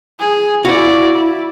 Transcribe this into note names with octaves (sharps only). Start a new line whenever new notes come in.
G#4
E4 F#4 D5 F5
E4